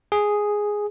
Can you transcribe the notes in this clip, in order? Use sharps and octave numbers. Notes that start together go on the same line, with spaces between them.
G#4